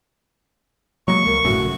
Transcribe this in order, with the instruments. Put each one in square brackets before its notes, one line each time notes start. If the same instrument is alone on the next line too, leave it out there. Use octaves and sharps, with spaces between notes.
[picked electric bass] F#3 G#3 A#3 [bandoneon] C#6
[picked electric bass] C#2 [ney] A#4
[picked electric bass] G1 A2 C#3 [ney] F#4
[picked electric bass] A#1